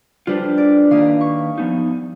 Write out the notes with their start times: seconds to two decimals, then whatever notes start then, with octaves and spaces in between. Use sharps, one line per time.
0.27 G3 D4 F4 B4 C5
0.58 D5
0.91 D#3 A#3 B4 F5 D#6
1.21 C#6
1.58 F3 B3 D#4